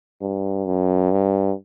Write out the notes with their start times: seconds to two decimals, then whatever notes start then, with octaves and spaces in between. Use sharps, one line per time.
0.21 G2
0.66 F#2
1.11 G2